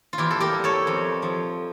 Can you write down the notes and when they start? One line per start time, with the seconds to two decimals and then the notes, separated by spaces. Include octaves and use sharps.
0.13 F4
0.18 E2 E4 G4
0.31 A4
0.40 G4 A#4
0.52 G3
0.64 A4 C#5
0.87 F2
1.22 F3